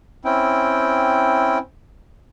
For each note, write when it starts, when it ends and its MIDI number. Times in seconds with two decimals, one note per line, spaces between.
0.25 1.58 60
0.25 1.58 61
0.25 1.58 64
0.25 1.58 79